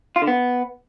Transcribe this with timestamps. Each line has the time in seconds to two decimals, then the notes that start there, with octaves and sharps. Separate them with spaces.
0.16 F4
0.22 D3
0.28 B3